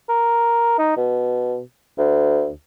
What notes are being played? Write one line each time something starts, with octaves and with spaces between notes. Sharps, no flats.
A#4
D#4
B2
D2